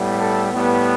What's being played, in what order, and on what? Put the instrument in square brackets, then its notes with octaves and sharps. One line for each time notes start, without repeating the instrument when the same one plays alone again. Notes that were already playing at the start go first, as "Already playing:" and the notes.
Already playing: [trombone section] A2 G3 B3
A4
A2 G3 B3